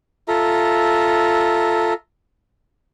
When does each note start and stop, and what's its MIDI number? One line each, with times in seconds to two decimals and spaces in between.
0.28 1.94 65
0.28 1.94 69
0.28 1.94 76
0.28 1.94 82